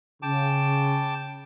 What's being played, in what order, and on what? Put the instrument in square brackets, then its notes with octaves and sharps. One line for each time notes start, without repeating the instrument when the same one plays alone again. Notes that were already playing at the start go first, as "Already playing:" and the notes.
[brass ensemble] C#3 [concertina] G5 A5 D6